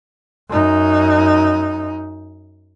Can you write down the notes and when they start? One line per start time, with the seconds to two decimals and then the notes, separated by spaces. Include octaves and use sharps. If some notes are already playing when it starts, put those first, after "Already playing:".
0.49 F#2 D#4